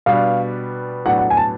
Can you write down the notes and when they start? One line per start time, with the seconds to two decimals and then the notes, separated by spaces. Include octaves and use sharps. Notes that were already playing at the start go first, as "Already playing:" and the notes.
0.06 B2 G3 B3 D4 F5
1.06 A2 F#3 B3 D4 F#5
1.18 F#5
1.30 G#5
1.37 A5